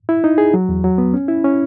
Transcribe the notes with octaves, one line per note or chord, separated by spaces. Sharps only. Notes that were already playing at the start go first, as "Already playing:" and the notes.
E4
D#4
G#4
F#3
E2
F#3
B3
C#4
E4
C#4